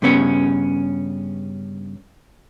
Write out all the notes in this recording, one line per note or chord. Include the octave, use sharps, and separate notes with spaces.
G2 C#3 B3 C#4